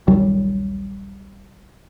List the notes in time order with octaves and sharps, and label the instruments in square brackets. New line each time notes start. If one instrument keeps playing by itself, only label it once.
[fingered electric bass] A#1 D#2 F#3 G3